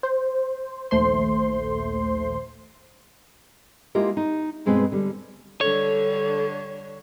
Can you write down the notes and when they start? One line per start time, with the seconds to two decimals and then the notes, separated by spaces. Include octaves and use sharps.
0.03 C5
0.91 A#1 D#2 A3 C5 C6
3.95 G#3 A#3 E4 F4 G4 A#4
4.17 D#4
4.66 G2 B2 G#3 C4 B4
4.92 D3 G3
5.61 D3 G3 D4 A4 C#5